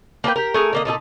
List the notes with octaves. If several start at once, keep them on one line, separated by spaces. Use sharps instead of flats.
A#3 D4 B4 G5
G4 A#4
A3 G#4 A#4
D3 A#3 D#5
A#2 D#4 E4 A4